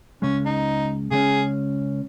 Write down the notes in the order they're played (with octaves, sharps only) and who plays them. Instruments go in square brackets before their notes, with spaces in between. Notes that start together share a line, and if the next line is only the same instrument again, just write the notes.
[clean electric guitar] C#2 C#3 G#3 [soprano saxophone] C#4
[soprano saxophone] D#4
[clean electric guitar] C#3 G#3 C#4 [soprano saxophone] G#4